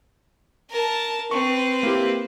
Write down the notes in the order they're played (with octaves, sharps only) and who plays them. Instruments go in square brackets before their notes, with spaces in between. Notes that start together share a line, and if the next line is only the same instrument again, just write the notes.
[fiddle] A#4 A5
[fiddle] C4 B4 [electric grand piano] C#6
[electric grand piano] A#3 E4 G4